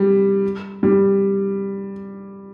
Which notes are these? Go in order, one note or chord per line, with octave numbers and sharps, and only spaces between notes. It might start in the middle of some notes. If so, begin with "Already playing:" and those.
Already playing: G3
G3